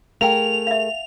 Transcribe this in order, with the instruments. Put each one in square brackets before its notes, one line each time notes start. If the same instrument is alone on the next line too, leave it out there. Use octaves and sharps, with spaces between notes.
[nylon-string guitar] A3 G#4 A#4 [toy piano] F5 G5 [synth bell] F7
[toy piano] E5 F5